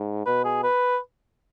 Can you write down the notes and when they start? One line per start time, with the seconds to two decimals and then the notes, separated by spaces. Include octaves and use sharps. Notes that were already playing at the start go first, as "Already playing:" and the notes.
Already playing: G#2
0.26 B2 B4
0.45 G#4
0.64 B4